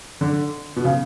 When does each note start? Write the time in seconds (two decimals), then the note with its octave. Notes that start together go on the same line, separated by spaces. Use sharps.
0.21 D3
0.76 B2
0.84 C#3